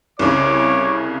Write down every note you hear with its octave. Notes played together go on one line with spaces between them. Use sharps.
C2 C#3 C#5 D6